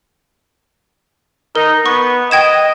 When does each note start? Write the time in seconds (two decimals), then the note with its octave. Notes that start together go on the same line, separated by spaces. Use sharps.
1.55 D#4 A#4
1.86 B3 C#6
2.31 D#5 G5 G#6 E7